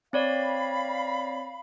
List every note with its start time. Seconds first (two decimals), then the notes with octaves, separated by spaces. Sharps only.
0.13 C4 C#5 D5 F5 B5